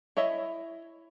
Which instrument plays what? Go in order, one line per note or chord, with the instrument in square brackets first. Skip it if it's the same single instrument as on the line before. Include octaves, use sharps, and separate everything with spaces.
[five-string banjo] E4 C#5 D#5 E5